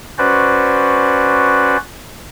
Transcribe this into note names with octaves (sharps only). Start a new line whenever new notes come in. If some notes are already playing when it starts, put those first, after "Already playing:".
C#4 F#4 B4 C5 D5